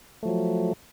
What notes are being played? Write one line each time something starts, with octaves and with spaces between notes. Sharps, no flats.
F3 F#3 A3